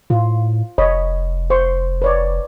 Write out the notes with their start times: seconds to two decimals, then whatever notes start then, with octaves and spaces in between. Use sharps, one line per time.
0.10 A2 F4
0.78 F1 C#5 D#5 B5
1.50 C5 C6 C#6
2.02 B4 C#5 D5